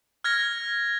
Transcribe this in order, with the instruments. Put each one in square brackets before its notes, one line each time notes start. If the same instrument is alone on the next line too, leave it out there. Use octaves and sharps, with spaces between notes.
[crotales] F6 G#6 A#6